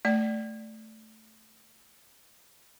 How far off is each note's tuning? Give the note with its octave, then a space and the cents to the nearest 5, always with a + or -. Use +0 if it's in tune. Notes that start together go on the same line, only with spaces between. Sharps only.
A3 +0 D5 +0